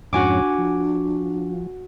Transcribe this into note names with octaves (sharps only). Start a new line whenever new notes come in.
F2 G#2 C#4 D4 F#4 G#5 D6
F3